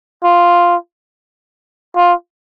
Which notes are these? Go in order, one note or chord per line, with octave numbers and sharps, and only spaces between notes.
F4
F4